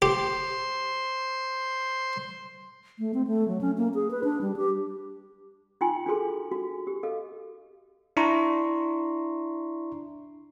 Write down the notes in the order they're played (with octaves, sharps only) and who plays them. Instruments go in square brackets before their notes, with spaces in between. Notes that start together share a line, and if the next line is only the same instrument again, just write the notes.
[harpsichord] G4 [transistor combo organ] C5 C6
[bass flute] A3
C4
A3
F#3
C#4
A#3
G#4
B4
D4
G3
G4
[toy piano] D#4 F4 G5 G#5 C6
D4 F4 F#4 G#4 A4 C6
F#4
G4
A4 D#5 F5
[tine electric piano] D4 E4 A#5 C6 C#6